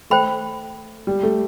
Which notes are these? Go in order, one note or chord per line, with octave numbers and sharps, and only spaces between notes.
A3 C5 G5 B5
G3
A3